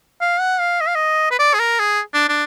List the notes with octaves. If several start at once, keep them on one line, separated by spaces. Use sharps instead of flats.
F5
F#5
F5
D#5
F5
D#5
B4
D5
G#4
A#4
G#4
D4
D4